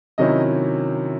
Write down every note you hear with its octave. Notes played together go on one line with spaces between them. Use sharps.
C3 D#3 F#3 C#4 E4 D#5